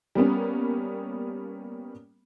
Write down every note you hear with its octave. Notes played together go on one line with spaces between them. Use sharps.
G3 A#3 B3 C#4